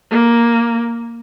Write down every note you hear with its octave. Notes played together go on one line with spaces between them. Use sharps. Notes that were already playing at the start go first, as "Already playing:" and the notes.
A#3